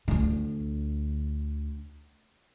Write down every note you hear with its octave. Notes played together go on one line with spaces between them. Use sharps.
D2 D3